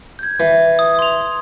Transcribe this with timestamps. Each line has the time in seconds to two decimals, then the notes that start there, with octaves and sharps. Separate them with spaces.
0.19 G6 G#6
0.40 E3
0.79 D#6
0.99 C6 F7